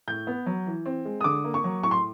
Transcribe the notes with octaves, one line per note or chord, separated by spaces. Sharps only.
A2 G6
B3
F#3
E3
C4
G#3
D#6
D3 D6
A#3
C#6
F#3
A2 C#6
C6